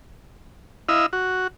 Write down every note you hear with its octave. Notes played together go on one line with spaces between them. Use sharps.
E4 D#5 F5 E6
F#4